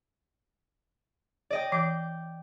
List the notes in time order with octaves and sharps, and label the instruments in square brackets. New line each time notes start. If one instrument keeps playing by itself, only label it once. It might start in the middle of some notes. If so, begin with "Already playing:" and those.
[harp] D5 D#5 G5
[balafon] E3 [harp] D6 G6